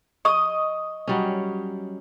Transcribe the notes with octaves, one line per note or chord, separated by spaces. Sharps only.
D#5 C#6 D#6
F#3 G3 C#4